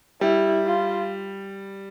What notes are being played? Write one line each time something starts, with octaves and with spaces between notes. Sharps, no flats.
G3 E4
F4